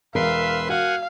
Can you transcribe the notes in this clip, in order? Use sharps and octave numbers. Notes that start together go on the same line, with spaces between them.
E1 A#4 B4 E5 F5 C6
F#4 F5 F#5 G#5